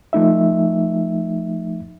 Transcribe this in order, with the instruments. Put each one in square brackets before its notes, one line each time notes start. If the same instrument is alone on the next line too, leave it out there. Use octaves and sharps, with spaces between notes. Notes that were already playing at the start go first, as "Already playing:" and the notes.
[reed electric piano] F3 A3 D#4 E5